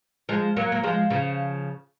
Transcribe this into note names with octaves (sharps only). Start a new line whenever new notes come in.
F3 G#3
F#3 A#3
A#3
F3 G#3
C#3 F3